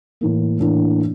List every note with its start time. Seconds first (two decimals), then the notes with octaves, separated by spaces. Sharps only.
0.21 A2 E3 A#3
0.60 A2 E3 A#3 D4